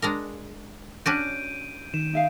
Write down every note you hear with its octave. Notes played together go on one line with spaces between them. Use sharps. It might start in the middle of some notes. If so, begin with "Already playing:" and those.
G#3 D4 A#4
C#4 D4 F#4 G6 D7 D#7
D#3 E7
D#4 E5 F5